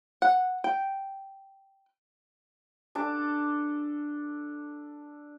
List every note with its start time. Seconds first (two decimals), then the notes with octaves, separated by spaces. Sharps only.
0.22 F#5
0.64 G5
2.95 D4 A4 D6